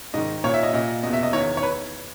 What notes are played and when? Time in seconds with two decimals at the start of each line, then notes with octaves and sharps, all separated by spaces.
0.14 G#2 D#3 D#5
0.44 A#2 C#5
0.54 E5
0.63 D#5
0.73 A#2 D#5
1.03 E2 B2 D#5
1.13 E5
1.23 D#5
1.33 E2 D#3 C#5
1.57 C#5
1.63 B4